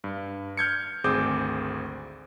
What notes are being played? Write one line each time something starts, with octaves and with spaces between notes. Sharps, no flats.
G2
F6 G6 G#6 C#7
G#1 D2 C4 G#4 D6 G6